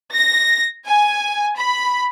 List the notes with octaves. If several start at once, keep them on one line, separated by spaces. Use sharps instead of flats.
A#6
G#5
B5